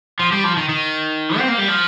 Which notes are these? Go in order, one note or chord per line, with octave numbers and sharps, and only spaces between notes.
F3
G3
F3
D#3
D#3
C4
A#3
G3
F3